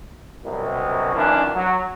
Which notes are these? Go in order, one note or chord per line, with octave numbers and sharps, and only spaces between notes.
C2 F#2 B2
F#2 A#2 D#3 E3 C#4 D4
F#3